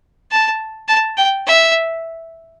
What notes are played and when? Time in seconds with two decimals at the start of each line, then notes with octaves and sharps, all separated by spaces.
0.31 A5
0.88 A5
1.17 G5
1.47 E5